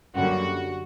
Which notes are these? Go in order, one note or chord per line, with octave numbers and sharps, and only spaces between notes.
F#2 D3 G3 A#3 F#4